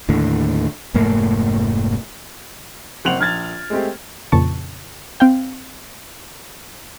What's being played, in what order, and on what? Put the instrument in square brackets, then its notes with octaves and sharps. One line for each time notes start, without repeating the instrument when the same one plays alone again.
[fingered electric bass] D#2 A2 D3
F1 G#2 A3 A#3
[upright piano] F#1 C4 F#5 F7 F#7
A#1 F6 G#6 A6
G#3 A3 C4 G4
[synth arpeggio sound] F2 A#2 C#3 A5 C#6
C4 F5 G5